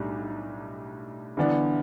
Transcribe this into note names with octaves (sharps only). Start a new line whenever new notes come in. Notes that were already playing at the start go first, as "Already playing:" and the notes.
Already playing: B1 A2 G3 D4
G1 G2 E3 B3 D4